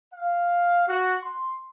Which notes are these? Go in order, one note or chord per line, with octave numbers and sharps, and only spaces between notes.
F5
F#4
C6